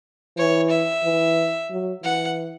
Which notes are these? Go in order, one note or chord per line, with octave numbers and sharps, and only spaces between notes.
E3 C#5
E5
E3
F#3
E3 F#5